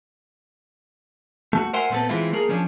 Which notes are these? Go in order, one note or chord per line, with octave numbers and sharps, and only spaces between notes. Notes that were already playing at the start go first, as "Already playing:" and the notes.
A3 F#4
A#4 C5 E5 F#5 G#5 C6
A#2 A3 B3 C4 A4
E3 G#3 C4 E4 F4
A3 A#3 G#4 A#4
F3 C#4 D4